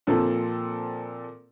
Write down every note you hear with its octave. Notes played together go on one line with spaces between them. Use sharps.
A#2 F3 C4 A4